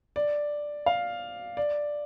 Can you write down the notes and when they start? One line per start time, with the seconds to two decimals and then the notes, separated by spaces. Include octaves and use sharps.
0.16 D5
0.86 F5
1.57 D5